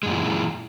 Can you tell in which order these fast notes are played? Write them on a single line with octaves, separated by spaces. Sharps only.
G#3 F#2 A#2 E3